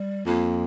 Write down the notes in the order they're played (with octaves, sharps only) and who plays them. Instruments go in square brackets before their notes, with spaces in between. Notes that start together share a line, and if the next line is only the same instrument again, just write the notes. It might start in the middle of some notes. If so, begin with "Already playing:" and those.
Already playing: [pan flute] G3
[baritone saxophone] F2 [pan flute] A#3